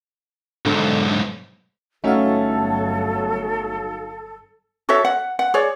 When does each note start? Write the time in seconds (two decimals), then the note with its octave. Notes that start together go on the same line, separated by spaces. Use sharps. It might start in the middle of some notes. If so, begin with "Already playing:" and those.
0.66 B1 G#2 D3
2.04 G1 F#3 A3 C#4 D#4 F#4 A4 F5
4.89 F#4 A4 C#5 E5
5.05 F#5
5.39 F#5
5.54 G#4 C#5 D5